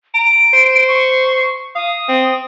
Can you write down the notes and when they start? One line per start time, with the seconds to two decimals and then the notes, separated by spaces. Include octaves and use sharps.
0.14 A#5 D7
0.53 C5
0.88 C#6
1.75 F5 D#6
2.09 C4